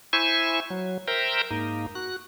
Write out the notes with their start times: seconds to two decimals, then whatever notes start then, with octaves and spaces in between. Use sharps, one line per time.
0.13 E4 C5 E5 G#5 C#6
0.70 F#3
1.08 A#4 C5 E5 G5 A#5
1.51 G#2 A#3 D#4
1.95 F#4 F#6